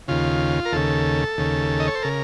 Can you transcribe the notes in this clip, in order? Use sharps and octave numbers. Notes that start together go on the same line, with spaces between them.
D#2 C#3 F4
A#4
D#2 C#3 A4
D#2 C#3
D#5
C#5
C5
C#3 A#4